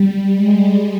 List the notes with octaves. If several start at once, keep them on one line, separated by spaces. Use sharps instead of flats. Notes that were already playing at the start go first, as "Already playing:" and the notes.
Already playing: G3
G#3